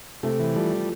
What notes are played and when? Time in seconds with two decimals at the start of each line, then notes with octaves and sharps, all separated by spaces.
0.23 C3 A3
0.40 E3
0.55 F3 G3